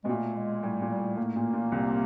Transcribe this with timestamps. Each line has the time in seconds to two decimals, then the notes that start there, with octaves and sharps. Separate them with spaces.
0.04 B2 G#3
0.09 A#2 A3
0.36 G#3
0.63 A2 G3
0.82 A#2
0.90 G3
0.99 A2
1.17 A2 A#3
1.36 A#2
1.53 A#2
1.72 C2 C3